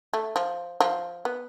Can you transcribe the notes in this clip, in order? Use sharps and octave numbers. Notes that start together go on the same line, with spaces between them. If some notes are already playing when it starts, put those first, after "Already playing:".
A3
F3
F3
B3